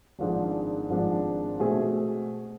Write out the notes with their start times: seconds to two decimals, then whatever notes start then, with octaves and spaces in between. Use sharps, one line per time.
0.19 G#1 G#2 F3 G#3 D4
0.89 G#1 G#2 F3 G#3 D4
1.59 B2 A3 C4 G#4